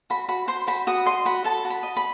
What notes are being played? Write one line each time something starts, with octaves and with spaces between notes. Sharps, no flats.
F#4 B5
F#4 B5
C5 C6
F#4 B5
F#4 D#6
D#5 C6
F#4 B5
A4 A5
F#4
B5
D#5
B5